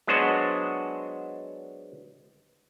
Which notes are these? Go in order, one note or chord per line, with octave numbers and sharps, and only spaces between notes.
F#3 G#3 B3 D4 F#4 C5